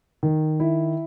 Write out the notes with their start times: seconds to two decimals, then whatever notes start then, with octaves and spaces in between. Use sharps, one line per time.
0.23 D#3
0.60 E4